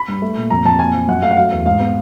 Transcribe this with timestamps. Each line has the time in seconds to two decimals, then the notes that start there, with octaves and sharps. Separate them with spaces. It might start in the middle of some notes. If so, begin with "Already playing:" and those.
Already playing: B5
0.08 G2
0.22 A3
0.37 A#2
0.50 F2 A#5
0.65 F2 A5
0.79 A#2 G#5
0.94 F3
1.08 F#2 F#5
1.22 A3 F5
1.31 F#5
1.37 F#3 F5
1.52 E2
1.66 G#2 F5
1.80 B3